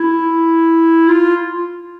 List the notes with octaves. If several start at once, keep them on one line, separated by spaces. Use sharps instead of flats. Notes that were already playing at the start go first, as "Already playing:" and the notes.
Already playing: E4
F4